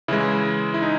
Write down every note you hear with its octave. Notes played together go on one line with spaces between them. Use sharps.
C#3 E3 G#3 E4
E4
D#4